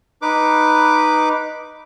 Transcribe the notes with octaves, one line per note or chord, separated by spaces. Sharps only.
D#4 B4 D6